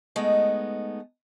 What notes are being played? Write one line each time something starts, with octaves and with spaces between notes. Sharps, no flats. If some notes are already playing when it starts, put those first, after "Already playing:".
G#3 A3 B3 D#4